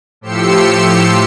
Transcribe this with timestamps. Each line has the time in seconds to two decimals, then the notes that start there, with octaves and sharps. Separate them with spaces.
0.21 A2 F3 G4 C6 E6 C#7